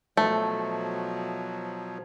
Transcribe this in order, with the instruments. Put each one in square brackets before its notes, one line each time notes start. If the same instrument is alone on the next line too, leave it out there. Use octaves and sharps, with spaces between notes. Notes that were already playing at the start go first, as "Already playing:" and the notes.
[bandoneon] B2 F3 F#3 [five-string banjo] A3